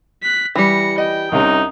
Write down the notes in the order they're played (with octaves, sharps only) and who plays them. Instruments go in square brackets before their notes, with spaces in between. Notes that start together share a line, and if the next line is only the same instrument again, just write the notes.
[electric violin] F#6 B6
[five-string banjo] E3 G3 [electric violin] A#6 C#7
[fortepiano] D#5 [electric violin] G5
[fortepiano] C2 C3 C#4 [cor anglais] D#4